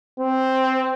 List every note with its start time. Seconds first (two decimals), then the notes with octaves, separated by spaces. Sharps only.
0.19 C4